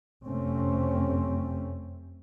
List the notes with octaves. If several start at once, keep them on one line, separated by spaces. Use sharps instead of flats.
F1 F#2 C3 A3 C4 C#4